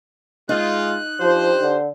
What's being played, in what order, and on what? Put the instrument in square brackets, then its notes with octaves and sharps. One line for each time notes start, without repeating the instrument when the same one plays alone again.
[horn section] G#3 F4 [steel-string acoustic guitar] D#4 [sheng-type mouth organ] F#6
[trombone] F3 [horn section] D4 G4 C5
[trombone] D3